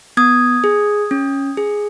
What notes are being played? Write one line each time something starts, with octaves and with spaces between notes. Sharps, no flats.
B3 D#6 G#6
G#4
C#4
G#4